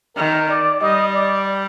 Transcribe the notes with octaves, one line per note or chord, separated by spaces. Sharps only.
D#3 A#4
D5
G3 D#5
D5